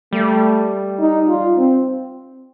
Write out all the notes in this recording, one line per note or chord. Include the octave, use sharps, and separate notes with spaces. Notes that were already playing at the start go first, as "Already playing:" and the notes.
G3 A3
D#4
F4
C4